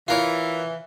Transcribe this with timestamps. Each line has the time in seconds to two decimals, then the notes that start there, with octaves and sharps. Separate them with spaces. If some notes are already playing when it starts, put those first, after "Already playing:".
0.08 E3 F4 A#4 C#5